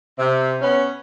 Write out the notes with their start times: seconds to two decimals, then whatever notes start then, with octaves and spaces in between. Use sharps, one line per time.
0.18 C3
0.61 B3 C#4